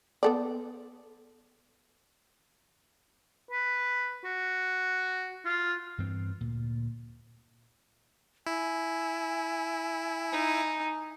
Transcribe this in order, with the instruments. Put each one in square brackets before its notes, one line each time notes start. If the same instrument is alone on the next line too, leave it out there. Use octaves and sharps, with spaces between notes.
[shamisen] B3 A4 D5
[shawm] B4
F#4
F4
[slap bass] G2 E3 C4
D2 A#2
[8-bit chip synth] E4 [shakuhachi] G#5
[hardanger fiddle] D#4